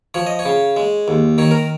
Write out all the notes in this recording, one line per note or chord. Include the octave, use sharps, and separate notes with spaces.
F3 C#5
D#5
C#5
C#3
G#3
D#2
D#3 C#5
A#4